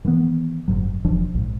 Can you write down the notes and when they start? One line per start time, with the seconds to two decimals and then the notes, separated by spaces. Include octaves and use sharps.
0.05 D#3 E3 G#3 B3
0.68 F#1 F2 G#2 F#3
1.05 E1 E3 F3 D4
1.34 A#1 G#2